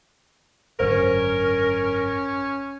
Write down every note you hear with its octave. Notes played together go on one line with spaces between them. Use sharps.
G#1 F#2 D3 C#4 A#4 C5